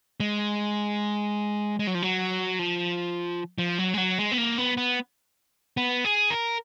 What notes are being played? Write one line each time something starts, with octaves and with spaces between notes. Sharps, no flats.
G#3
G#3
F#3
F3
F#3
F3
F3
F#3
G#3
F#3
G#3
B3
A#3
B3
B3
B3
G#4
A#4